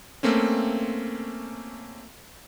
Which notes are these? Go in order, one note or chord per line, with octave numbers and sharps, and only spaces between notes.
A3 A#3 C4 C#4